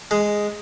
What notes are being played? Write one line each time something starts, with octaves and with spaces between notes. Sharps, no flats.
G#3